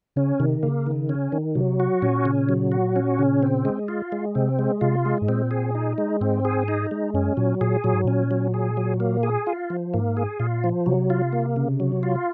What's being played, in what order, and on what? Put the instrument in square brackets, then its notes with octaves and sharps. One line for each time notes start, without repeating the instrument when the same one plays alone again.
[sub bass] C#3 [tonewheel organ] C#4
[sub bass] C3 [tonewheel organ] D#3
[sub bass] C#3 [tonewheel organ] A#3
[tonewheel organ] D#3
C#4
D#3
[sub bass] C3 [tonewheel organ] F#3
[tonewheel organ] F#4
[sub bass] A#2 [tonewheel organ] C#4
[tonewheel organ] C#3
F#3
F#4
C#4
C#3
C4
G#3
F4
G#3
[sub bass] C3 [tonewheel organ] C4
[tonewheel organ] G#3
[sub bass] C3 [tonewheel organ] F4
[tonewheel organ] G#3
[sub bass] G#2
[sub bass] A#2 [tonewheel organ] C4
[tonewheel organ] G#4
D#4
G#3
[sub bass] G#2 [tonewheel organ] C4
[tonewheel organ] G#4
D#4
G#3
[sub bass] F#2 [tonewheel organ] C#4
[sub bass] A#2 [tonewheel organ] F#3
[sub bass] A#2 [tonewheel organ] G#4
[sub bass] A#2 [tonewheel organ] F#3
[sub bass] G#2
[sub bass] A#2 [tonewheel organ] C#4
[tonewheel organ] F#3
G#4
F#3
A#3
G#4
F4
F3
[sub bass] G#2 [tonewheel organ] A#3
[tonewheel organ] G#4
[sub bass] A#2 [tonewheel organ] F4
[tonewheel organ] F3
[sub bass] C3 [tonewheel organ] F#3
[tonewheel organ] F4
A#3
C#3
F#3
F4